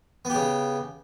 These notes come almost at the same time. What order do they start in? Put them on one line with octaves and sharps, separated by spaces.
B3 G4 C#3